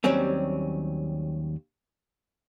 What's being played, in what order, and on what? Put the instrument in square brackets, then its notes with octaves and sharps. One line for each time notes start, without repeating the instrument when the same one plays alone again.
[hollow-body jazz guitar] D#2 F#3 G3 C4 C#4